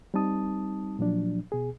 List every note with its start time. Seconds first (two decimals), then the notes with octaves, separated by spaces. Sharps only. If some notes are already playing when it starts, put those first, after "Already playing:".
0.14 G3 C4 D#4 A5 D#6
0.99 A#2 F3 F#3 D4
1.52 B2 G#4